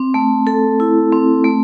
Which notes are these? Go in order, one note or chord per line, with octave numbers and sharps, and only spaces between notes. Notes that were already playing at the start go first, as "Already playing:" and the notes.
Already playing: C4
A3
A4
E4
C4
A3